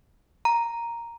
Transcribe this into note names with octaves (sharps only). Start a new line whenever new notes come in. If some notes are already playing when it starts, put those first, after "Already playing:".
A#5